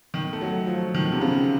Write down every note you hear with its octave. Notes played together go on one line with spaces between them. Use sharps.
D#3
A3
F#3
F3
D#3
C3
C#3